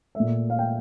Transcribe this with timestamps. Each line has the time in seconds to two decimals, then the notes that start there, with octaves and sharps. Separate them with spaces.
0.15 A#2 A3 E5
0.50 F5
0.59 G5